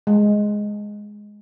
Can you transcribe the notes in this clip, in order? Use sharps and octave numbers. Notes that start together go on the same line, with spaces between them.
G#3